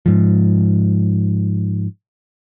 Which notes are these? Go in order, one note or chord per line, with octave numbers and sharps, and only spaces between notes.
G#2 F3